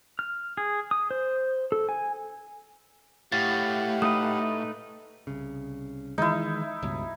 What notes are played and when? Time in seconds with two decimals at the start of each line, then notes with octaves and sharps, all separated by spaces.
0.19 F6
0.57 G#4
0.91 D#6
1.11 C5
1.72 A4
1.89 G#5
3.32 A2 G4 F5 F#5 A6
4.02 A3 D#4 B4 D#6
5.27 C2 C#3
6.18 D#3 E3 G#3 D#4 E4
6.83 C#2 G2 B2